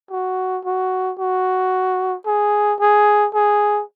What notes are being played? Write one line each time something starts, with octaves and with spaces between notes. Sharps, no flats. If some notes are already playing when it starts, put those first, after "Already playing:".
F#4
F#4
F#4
G#4
G#4
G#4